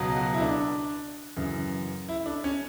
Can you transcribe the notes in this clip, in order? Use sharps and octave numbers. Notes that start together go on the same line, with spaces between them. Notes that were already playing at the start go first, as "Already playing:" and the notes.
Already playing: C#2 B2 F#3
F#4
E4
D4
F#2 C#3 E3
E4
D4
C#4